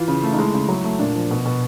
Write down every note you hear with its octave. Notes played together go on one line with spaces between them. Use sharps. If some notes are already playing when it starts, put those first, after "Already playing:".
Already playing: E3 F4
C#3
A3
D#4
G#3 E4
C#3
F#3
A3
A#2 D4
F3
B2
B2